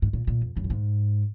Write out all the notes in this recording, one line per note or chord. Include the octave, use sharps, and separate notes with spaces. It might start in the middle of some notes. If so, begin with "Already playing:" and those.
G#2
A#2
A#2
F2
F#2
A#2
G#2